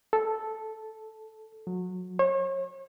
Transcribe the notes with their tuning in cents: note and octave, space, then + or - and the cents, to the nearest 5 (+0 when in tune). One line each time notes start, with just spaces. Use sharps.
A4 -5
F#3 -25
C#5 -40